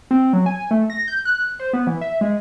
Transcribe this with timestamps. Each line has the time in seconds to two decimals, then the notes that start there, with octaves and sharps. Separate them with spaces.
0.11 C4
0.33 F#3
0.46 G#5
0.71 A3
0.90 A#6
1.08 G6
1.25 F#6
1.59 C5
1.73 B3
1.87 E3
2.01 E5
2.21 G#3